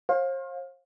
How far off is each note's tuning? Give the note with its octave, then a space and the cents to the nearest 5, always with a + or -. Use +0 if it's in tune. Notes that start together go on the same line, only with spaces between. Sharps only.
C5 +45 F5 +20